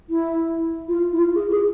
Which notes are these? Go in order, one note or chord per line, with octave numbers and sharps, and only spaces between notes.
E4
F4
E4
F4
G#4
G#4